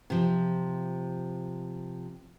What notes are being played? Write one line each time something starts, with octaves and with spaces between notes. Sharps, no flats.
C3 F3